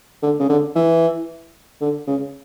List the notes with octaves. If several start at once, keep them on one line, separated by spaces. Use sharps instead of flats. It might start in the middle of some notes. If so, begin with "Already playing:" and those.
D3
C#3
D3
E3
D3
C#3